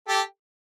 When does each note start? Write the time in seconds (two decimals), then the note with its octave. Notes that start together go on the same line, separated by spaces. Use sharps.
0.08 G4 A4